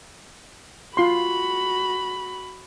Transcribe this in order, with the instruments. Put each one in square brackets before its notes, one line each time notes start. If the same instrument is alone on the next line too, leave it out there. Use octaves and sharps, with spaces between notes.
[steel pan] F4 C6 [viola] F#4 B5